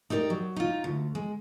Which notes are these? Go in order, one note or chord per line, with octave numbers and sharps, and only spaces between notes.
D#4 G4 A#4 D5
F#3
D#4 F4
D2
G#3